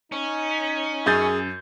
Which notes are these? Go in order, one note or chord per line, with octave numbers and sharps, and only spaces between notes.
C#4 D#4
F#2 G#4 G6 A6